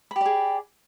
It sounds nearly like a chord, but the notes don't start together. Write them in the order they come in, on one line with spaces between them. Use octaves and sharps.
B5 G4 D5 G#4